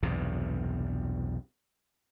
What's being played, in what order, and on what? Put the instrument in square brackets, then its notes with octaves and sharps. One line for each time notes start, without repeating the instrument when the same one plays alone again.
[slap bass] B1 E2 G2 C3